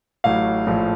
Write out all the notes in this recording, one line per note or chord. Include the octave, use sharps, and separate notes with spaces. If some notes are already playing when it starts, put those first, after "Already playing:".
A1 A2 F#3 F5
A#1 A2 F3